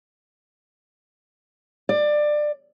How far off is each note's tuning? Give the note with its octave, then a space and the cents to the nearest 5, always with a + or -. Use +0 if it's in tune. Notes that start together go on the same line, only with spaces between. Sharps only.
D5 +20